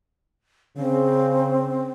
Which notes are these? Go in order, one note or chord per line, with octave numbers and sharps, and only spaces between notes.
C#3 C4